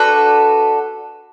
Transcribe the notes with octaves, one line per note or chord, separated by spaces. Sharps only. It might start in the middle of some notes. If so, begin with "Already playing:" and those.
Already playing: D4 F#4 A4 B4